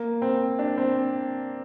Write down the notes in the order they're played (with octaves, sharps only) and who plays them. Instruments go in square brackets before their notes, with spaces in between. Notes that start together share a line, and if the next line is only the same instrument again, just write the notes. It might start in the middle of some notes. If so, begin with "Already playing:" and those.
Already playing: [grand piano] A#3
C4
D4
C4